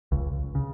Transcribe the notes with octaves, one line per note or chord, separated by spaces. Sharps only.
C#2
C#3